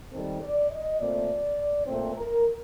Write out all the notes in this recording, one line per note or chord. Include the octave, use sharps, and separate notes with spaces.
D#3 G3 C4 A4
D5
D#5
A#2 A3 C4 D5
A#2 A3 C4
A#4